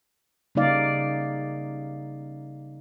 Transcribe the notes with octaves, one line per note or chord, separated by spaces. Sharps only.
C#3 G3 A#3 D#4 D5 F5